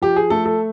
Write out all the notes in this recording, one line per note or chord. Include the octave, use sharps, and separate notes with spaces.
F3 G4
G#4
A3 A4
A4